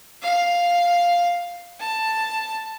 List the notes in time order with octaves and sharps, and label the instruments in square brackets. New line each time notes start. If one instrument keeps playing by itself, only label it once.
[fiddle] F5
A5